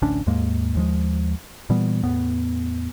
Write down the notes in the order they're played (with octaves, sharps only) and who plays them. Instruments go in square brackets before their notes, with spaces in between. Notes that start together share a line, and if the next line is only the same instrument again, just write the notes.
[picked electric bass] A1 D2 C#4 D4
D#2 G#2 G#3 A#3
D#2 F3 G#3
A#2 E3 G3 B3
E2 A2 B3